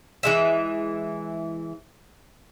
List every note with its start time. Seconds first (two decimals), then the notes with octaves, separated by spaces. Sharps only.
0.23 E3 G#3 E5